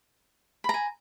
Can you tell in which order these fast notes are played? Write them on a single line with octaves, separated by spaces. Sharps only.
B5 A#5 G#5